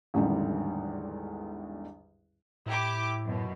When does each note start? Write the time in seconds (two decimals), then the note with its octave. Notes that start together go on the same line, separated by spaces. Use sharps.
0.14 A1 E2 G#2 D3 D#3 G3
2.66 A2 E4 G4 D6
3.24 F#2 B2